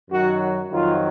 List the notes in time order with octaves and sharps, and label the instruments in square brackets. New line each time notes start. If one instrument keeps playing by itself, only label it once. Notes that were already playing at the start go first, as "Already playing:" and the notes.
[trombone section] F#2 D#3 F#3 F#4
F2 D#3 F#3 F4